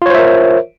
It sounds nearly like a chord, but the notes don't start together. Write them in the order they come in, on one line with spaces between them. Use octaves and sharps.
F4 C#5 C5 E5 A#4